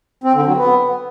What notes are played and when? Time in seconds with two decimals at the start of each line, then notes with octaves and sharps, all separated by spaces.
0.24 C4
0.35 D3
0.46 F#3
0.56 B3